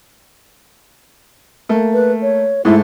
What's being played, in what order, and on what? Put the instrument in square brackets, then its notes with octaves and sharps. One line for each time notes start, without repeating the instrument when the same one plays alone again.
[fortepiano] A3 A#3
[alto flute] B4
C#5
[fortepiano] G#2 G#3 A3 [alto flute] E4